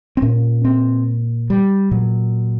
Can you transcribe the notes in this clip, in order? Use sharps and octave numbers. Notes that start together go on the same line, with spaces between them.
C4
A#2 C#4
C4
G3
A#2 F#3